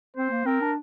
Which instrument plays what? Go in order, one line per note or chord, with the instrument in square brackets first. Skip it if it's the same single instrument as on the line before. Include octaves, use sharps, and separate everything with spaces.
[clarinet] C4 [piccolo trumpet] C5
[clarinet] A#3
[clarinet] C4 [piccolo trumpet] A#4
[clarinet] D4